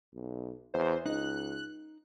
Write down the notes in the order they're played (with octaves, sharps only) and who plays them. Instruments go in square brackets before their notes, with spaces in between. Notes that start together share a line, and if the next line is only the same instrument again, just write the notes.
[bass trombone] B1
[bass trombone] E2 [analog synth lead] C5
[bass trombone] C#2 [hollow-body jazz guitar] D#4 [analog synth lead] F#6